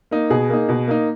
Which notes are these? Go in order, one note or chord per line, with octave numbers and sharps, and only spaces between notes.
A#3 D#4
B2 G#4
A#3 D#4
B2
A#3 D#4